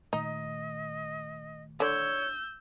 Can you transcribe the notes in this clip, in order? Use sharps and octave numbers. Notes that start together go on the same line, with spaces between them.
A#2 D#3 A3 D#4 D#5
D3 C#5 D5 E6 G6